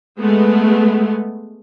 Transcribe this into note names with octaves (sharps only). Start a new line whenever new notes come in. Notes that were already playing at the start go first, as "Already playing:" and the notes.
G#3 A3 B3